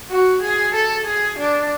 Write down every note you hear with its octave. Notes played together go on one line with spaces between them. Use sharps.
F#4
G#4
A4
G#4
D4